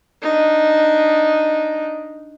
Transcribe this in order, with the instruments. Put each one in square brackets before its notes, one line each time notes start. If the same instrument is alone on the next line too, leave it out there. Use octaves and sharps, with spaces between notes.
[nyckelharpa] D4 D#4